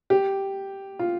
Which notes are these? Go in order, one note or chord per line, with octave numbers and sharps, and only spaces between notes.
G4
F4